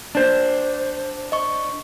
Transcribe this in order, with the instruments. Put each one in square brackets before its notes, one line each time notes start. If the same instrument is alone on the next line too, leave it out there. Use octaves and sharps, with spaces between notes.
[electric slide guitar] D4 C5
[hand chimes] D#5 C#6